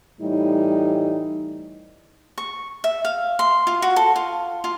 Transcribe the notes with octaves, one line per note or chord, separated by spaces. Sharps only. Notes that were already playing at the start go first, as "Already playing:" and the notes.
A2 E3 G3 D#4
C#6
E5
F5
C6
F4
F#4
A4
F4
F4